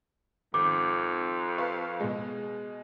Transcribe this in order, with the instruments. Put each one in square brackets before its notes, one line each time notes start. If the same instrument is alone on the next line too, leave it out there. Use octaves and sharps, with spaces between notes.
[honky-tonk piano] G#1 [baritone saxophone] F2 [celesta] D6
[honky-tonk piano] B4 F5 C#6
B2 G#3